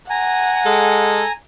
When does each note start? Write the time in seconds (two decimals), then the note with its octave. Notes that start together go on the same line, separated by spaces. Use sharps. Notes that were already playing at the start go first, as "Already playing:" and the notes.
0.10 F#5 G#5 A#5
0.66 G#3 A4